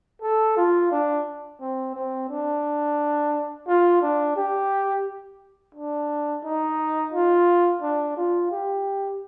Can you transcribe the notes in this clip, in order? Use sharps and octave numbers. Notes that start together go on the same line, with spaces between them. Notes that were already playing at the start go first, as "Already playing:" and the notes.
A4
F4
D4
C4
C4
D4
F4
D4
G4
D4
D#4
F4
D4
F4
G4